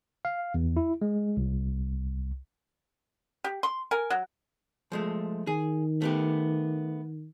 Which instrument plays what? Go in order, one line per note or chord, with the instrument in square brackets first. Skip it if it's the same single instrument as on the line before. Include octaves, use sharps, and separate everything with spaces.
[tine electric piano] F5
E2
E4
G#3
C2
[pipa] G4
C6
A#4 G#5
F#3
[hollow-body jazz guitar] F3 G#3 A3
[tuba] D#3 [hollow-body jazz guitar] G#4
[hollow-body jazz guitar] A3 B3 G4